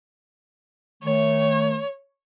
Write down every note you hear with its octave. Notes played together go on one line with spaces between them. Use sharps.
D#3 A3 C#5